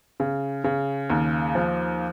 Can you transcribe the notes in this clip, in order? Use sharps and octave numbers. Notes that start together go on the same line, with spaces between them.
C#3
C#3
D#2
F3